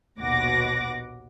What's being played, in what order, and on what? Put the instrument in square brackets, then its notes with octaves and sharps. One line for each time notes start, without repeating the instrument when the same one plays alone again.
[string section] A#1 D#2 B2 F#5 D6 A#6